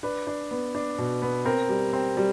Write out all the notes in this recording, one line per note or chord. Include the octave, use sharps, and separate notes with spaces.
D4 B4
D4
B3
D4
B2
B3
C4 A#4
G3
C4
G3